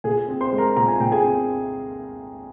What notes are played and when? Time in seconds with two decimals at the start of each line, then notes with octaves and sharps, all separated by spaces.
0.04 A#2 G#4 G#5
0.28 C4
0.41 C5 C6
0.52 G#3
0.58 A#4 A#5
0.76 A#2 A#5
0.88 G#5
1.00 A#2 G5
1.12 G#4 G#5
1.24 C4